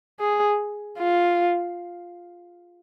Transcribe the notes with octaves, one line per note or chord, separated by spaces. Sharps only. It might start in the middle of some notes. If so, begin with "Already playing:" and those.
G#4
F4